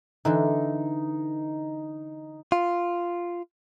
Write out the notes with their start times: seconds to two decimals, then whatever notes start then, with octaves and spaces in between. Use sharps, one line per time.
0.25 D3 E3 D#4 A4
2.52 F4